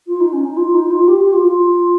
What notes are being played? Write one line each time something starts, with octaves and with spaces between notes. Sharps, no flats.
F4
D#4
C#4
D#4
F4
D#4
F4
G4
G4
F4
F4